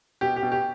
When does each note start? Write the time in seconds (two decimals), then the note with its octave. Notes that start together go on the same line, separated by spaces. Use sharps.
0.21 B2 G4
0.36 G4
0.43 B2
0.52 G4